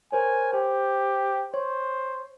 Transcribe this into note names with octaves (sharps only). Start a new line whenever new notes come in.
A#4 C5 C#5 G#5
G4 C5
C5 C#5